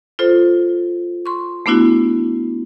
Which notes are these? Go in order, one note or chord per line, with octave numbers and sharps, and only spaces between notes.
F4 A4 C5
C6 C#6
A3 B3 D4 E4 F#4